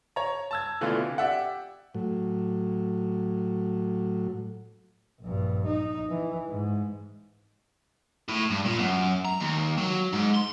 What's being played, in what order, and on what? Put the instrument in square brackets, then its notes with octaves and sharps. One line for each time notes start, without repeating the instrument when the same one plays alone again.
[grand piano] C#5 A#5
A5 E6 G#6
B2 D3 E3 A3 F4
C3
G4 D5 E5 F#5
[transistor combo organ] A2 F#3
[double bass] A#1 G2
D#4
E3
G#2
[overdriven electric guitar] A2
G2
A#2
F#2
A#5
D#2
F#3
G#2
C6